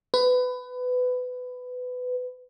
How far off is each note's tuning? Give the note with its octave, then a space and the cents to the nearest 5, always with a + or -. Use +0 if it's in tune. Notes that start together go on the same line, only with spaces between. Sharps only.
B4 +20